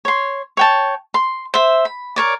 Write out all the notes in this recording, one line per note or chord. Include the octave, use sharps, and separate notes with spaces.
C#5 C6
C#5 G5 A5
C6
C5 E5
B5
A#4 C#5 D5